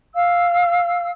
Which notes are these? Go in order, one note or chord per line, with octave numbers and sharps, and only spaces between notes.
F5 E6